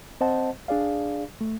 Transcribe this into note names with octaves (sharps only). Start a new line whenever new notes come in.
C4 C5 D#5 F#5 A5
D4 G#4 D5 F5
A3